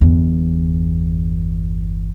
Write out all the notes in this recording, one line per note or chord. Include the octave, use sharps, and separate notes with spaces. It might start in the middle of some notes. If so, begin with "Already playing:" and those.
G1 E2